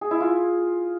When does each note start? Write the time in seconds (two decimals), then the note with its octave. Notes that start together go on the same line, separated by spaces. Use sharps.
0.01 G#4
0.11 E4
0.21 F4